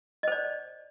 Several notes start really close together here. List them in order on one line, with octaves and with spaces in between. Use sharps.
D#5 C5 D5